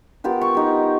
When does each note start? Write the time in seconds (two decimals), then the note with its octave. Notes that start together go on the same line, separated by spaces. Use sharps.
0.24 B3 F4 G4 A#4
0.41 C#6
0.55 D#4 G4